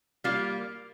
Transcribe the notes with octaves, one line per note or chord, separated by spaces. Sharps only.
G3 A#3 F4